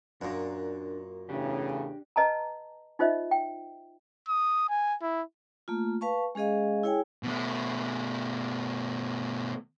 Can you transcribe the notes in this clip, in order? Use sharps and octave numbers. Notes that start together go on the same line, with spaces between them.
F#2 A#2 D4
E2 A2 C#3 D4 G4
B4 D#5 A5 A#5
D#4 F4 C5 D#5 E5
G5
D#6
G#5
E4
A3 A#3 F4
B4 F5 A5 C#6
G#3 C#4 G#4 D#5 F5
E4 G#4 C#5 G5 G#5
B2 A3